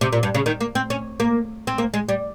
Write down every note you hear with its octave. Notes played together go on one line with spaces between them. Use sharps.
C3
A#2
G2
C#3
D#3
A#3
C4
C#4
A#3
C4
A#3
G#3
G3